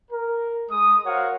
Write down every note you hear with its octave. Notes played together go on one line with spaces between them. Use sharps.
A#4
G#3 D#6
F#4 A#4 C5 C#5 F5 F#5